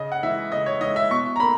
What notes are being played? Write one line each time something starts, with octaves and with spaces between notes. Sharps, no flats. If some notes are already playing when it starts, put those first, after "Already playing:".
Already playing: C#3 D#5
F#5
E3 G#3 E5
C#3 D#5
C#5
E3 G#3 D#5
E5
B2 C#6
A#5
A#3 B5